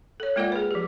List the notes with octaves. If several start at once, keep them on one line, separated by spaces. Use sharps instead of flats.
A4 C#5
G#3 A#3 F4 A#4 D5 F#5
G#4 B4
F3 G4